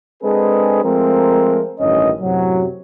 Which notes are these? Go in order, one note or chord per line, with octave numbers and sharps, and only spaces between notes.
G#3 C4 D4 G#4 A4 B4
F3 G#3 A3 C4 A#4
A1 G2 D#3 C#4 D#5
F#2 A2 C3 F#3